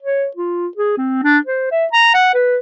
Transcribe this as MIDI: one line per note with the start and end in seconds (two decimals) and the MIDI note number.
0.03 0.27 73
0.36 0.67 65
0.77 0.94 68
0.98 1.18 60
1.24 1.38 62
1.47 1.69 72
1.71 1.86 76
1.93 2.13 82
2.14 2.30 78
2.34 2.57 71